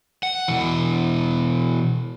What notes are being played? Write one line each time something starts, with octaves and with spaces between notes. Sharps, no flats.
F#5
B2 E3